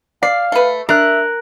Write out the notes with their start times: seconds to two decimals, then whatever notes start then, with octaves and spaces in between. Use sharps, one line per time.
0.23 D5 F5 C7
0.52 A3 B4
0.89 D4 A#4 E5 F#6